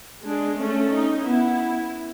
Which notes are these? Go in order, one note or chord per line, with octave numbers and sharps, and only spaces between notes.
G#3 D4
A3 C#4
D#4
B3 E4